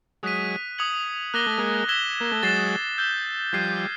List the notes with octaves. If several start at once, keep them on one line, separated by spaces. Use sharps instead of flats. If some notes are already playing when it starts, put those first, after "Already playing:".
F#3 G#3 D#6 F#6 B6 D#7
D#6 G#6 C#7 F#7
A#3 D6 F#6 A#6 D#7 G7
A3
G#3 A#3
E6 G#6 B6 E7 G7
A#3
A3
F#3 G#3 A6 C7 E7
E6 G6 B6 E7 G7
F3 G3 F6 G#6 C7 D#7